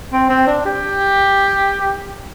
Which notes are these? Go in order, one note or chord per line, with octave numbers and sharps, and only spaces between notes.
C4
C4
D4
G4